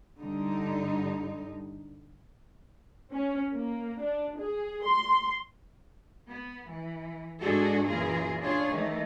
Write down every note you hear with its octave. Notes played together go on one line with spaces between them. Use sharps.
G2 D3 G3 D#4
C#4
A#3
D4
G#4
C6
B3
E3
G#2 G#3 D4 F#4 G#4 A4
F#2 A#2 E3 F4 G#4 A#4
D4 F4 G#4 C#5
D#3 E3 A3 D#4